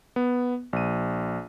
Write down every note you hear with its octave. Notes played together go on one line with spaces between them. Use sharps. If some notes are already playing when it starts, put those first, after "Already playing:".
B3
A#1 D#7